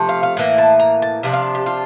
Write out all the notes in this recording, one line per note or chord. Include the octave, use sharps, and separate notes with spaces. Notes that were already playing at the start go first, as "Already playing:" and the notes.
Already playing: C3 F3 A3
F5
F5
A2 E3 A#3
A5
A#5
A5
C3 F3 D4
F5
G4
F4